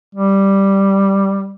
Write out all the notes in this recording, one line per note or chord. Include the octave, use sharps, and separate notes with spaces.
G3